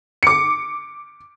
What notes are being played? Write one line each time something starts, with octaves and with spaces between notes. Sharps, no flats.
D6 C#7